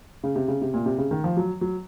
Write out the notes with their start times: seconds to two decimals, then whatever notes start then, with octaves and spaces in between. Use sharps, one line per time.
0.24 C#3
0.36 C3
0.48 C#3
0.61 C3
0.74 A#2
0.86 C3
0.98 C#3
1.11 D#3
1.24 F3
1.37 F#3
1.61 F#3